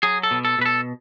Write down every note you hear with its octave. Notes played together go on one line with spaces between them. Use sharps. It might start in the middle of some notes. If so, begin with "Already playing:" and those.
F#3 G#4
A4
B2
A4
B2 B4
A4